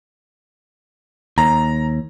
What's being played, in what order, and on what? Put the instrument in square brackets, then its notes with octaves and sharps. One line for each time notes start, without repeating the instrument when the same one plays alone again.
[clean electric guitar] D#2 [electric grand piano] A#5